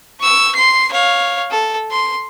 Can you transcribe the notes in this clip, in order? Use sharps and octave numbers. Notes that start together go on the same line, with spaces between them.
C#6 E6
C6 C7
C#5 F5
A4
C6